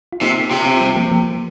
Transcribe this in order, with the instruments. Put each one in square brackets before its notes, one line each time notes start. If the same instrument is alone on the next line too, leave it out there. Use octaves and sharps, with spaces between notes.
[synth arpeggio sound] F4
[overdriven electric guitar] C3 [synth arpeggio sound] A#3 D#4
[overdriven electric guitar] C3 [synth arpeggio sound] C4 F4
[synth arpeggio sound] C4 F4
G3 C4
F3 A#3
F3 A#3